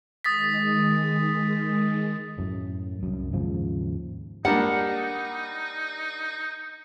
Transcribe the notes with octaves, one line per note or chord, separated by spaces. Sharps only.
D#3 G#3 D#6 A6 B6
F#2 A2
C2 F#2
D#2 G#2 C#3 F3
G3 A#3 D4 D#4 F#5